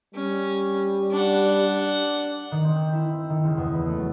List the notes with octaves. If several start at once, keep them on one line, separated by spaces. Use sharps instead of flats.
G3 C#4
D4 F#5
D#3
C4
G6
E4
C4
D#3
C#2
E2
B5
A3
F#3